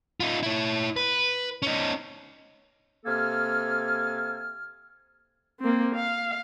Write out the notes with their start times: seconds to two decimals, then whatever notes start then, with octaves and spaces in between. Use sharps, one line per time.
0.20 D#4 F4
0.43 E4 C#5
0.96 B4
1.62 C#4 D#4
3.06 C3 A#3 A4 G#5 F6
5.60 A#3 C4
5.95 F5